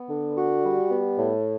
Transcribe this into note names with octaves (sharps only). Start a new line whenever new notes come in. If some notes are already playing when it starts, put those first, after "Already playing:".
Already playing: B3
D3
F#4
G3
B3
A2